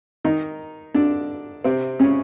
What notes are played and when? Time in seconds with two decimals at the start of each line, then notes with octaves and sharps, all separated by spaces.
0.25 D#3 D#4
0.94 D3 D4
1.64 C3 C4
2.00 C#3 C#4